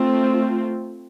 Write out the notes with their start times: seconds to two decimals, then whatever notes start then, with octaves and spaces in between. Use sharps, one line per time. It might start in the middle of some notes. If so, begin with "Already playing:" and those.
Already playing: A3 C4 F4